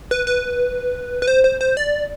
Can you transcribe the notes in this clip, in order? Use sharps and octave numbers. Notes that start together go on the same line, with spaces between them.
B4
B4
B4
C5
C5
C5
D5